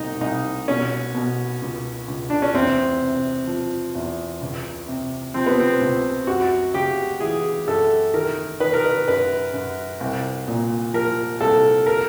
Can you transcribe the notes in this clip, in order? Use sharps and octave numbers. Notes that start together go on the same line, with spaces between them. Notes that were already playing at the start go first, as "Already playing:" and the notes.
Already playing: C2 B2 D#4
C2 D#4
B2 C#4
B2
C#2
C#2
D4
C#4
E2 C4
C3
F3
E2
C#2
C3
F3 C4
B3
C4
C#2
F#2 F#4
C#3 G4
E3 G#4
F#2 A4
D#3 A#4
D#3 B4
A#4
B4
F#2 B4
F#2
C2
A#2
F3 A#4
C2 A4
A#4